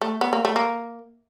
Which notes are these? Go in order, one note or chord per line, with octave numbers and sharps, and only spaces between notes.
A3
B3
A#3
A3
A#3